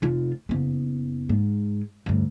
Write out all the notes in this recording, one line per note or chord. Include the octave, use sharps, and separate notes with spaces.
F1 F4
F#1 B3
G#2
D2 G2